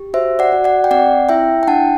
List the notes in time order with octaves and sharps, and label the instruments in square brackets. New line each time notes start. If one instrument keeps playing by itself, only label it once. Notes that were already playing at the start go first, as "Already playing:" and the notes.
Already playing: [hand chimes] G4
F#4 C5 E5
D5 F#5
F#4
D5 F#5
G5
C4 D5 F#5
E4 E5 G5
G5
D4 F#5 A5